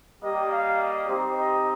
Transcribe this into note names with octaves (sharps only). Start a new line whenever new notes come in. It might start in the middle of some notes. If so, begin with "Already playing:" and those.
G3 A#3 G4 D#5
F5
D#5
C4 D#4 G4 C5
D#5